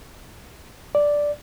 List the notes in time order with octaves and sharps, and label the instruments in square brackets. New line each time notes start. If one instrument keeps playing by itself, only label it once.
[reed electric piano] D5